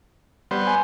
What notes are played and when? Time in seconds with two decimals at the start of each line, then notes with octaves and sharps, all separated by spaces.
0.51 G3 B3 C5
0.67 G#5